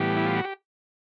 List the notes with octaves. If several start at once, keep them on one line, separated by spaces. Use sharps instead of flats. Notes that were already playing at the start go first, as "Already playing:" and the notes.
Already playing: A2 E3 G3 B3 G4
E4
F4
F#4
G4